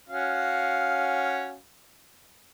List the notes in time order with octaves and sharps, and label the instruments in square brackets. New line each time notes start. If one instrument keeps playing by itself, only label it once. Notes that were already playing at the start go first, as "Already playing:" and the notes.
[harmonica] C#4 F#4 F5